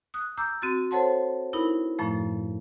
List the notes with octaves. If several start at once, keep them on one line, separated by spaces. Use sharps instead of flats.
D#6 F#6
A#5 D6 E6 G6
C4 F#4 A6
A4 C5 C#5 F#5 A5 C6
D#4 E4 A#4 B5
F#2 A2 F3 A3